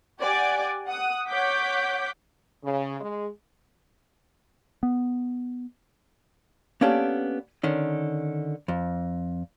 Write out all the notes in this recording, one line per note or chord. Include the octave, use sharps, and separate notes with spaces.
G4 D5 F#5 G#5 D6
F#5 D#6
C#5 F#5 D6 G6 B6
C#3
G#3
B3
A#3 B3 C#4 D4 G4 A4
D3 D#3 C#4
F2